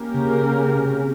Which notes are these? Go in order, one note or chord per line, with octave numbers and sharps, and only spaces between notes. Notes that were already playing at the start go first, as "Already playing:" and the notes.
Already playing: A#3 C#4 G4 A#4
C#3
C#3
C#3
C3
C3